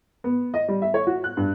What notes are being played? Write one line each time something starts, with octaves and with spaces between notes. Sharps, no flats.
B3
D#5
G3
E5
C#5
F#4
F#6
G2